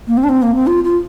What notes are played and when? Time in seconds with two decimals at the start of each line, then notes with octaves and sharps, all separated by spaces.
0.07 A#3
0.17 C4
0.24 D4
0.29 C4
0.42 A#3
0.55 C4
0.67 F4
0.84 F4